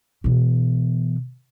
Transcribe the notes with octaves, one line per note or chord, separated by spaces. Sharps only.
B2 E3